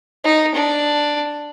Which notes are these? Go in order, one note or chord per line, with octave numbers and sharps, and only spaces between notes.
D#4
D4